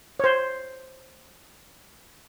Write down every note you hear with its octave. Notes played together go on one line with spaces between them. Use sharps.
C5 C#5